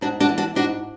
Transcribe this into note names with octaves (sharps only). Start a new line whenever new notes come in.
G#2 D4 F#4
D4 F#4
E3
D4 F#4
G#2 D4 F#4